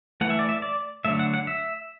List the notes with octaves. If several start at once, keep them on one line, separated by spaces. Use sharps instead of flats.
E3 A3 F#5
E5
D5
E5
D5
D3 F#3 A3 E5
F#5
F#5
E5